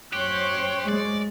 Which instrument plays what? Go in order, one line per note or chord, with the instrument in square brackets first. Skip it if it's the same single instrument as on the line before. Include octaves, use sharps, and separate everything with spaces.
[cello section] F#2 C5 C#5 [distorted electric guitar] G4 [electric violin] F#6
[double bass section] G#3 [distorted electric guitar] D5